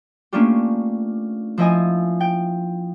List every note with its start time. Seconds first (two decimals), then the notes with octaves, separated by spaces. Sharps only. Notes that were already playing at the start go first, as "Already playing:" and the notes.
0.33 A3 A#3 C#4 D4 F4 G4
1.58 F3 E4 D#5 G#5
2.20 G5